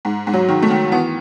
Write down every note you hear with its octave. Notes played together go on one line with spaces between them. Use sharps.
G#2
G#2
F#3
D#3
A3
D#3
E3 B3